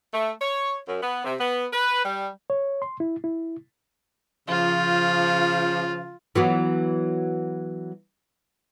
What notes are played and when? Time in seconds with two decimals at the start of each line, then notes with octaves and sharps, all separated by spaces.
0.13 A3
0.41 C#5
0.88 F#2
1.02 B3
1.25 C3
1.40 B3
1.73 B4
2.04 G3
2.50 C#5
2.82 C6
3.00 E4
3.24 E4
4.49 C#3 F3 F4
6.35 E3 F#3 B3